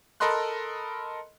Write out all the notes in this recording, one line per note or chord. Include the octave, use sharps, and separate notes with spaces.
A4 A#4 D#5 B5 C6 F#6